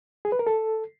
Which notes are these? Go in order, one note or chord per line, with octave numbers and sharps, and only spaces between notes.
G#4
B4
A#4
A4